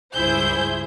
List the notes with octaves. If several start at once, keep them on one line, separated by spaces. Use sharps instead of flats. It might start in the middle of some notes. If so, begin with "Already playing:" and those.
C#2 G2 E4 G#4 C5 G6